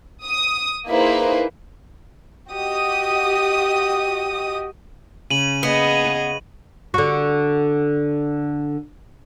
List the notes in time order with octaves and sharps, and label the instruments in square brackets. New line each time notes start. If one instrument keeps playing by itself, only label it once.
[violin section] D#6
A#3 D#4 E4 G#4 B4 C5
F#4 G4 D#5 D#6
[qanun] C#3 [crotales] D#7 F#7
[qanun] A#3 [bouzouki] B3 [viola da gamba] G#4 D#5
[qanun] B4 F#5 C#6
[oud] D3 F#4